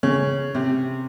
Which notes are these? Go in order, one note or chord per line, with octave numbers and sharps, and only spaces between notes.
C#3
C3